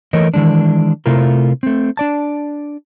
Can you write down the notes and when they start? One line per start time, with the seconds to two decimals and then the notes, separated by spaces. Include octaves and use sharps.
0.13 E3 A3 A#4 C#5 D#5
0.34 D#3 E3 G#3 D4
1.06 C3 A3 E4 F4 A#4
1.63 A3 C4
1.97 D4 D5 A5